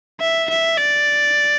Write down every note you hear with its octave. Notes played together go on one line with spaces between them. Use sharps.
E5
E5
D5